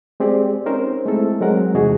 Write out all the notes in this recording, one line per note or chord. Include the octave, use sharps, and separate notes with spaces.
G#3 C4 G4 G#4 D5
C4 C#4 D#4 A#4 C5
G#3 A3 C4 E4 A4
F#3 G#3 C4 A#4 F#5
E2 C3 G#3 D#4 F#4 G#4